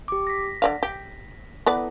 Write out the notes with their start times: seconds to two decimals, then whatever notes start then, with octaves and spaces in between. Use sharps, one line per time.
0.08 G4 D6
0.27 A#6 B6
0.62 D3 D5 F5
0.83 G4
1.66 B3 E4 A4 B4 D5